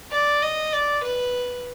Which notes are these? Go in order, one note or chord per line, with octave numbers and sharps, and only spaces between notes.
D5
D#5
D5
B4